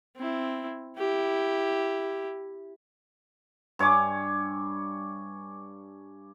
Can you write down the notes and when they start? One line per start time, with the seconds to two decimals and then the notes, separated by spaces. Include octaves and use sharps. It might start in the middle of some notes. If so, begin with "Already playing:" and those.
0.16 C4 E4
0.98 E4 G4
3.79 G2 C#5 G#5 D6